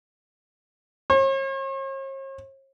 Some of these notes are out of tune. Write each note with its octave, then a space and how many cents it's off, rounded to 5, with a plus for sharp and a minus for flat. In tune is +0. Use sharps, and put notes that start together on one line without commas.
C#5 -45